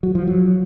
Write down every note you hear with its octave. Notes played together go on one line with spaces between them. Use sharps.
F#3
F3
F#3